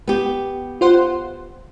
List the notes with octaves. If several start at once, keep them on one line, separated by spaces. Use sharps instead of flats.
B3 G4
F4 C5 F#5